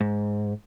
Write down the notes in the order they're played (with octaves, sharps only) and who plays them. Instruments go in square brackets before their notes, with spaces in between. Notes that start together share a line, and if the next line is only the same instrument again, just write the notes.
[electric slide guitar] G#2